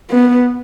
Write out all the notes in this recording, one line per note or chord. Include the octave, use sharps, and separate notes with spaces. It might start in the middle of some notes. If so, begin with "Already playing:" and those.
B3